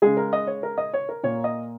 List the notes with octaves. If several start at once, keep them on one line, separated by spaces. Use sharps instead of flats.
C#3 G#3 G#4
A#4
D#5
C#5
A#4
D#5
C#5
A#4
A#2 A#3 C#5
D#5